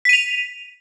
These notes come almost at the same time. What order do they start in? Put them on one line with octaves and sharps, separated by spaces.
B6 D#7 F7